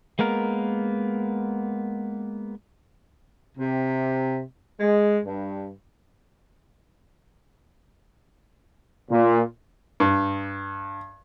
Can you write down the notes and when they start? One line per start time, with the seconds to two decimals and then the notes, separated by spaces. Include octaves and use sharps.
0.19 G#3 A#3 B3 A#4
3.58 C3
4.80 G#3
5.25 G2
9.10 A#2
10.00 G2